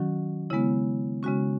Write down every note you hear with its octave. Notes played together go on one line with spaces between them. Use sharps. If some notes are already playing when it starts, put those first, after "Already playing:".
Already playing: D#3 F#3 C#4 F#4
C#3 G#3 B3 E4
C#3 G#3 C#4 F#4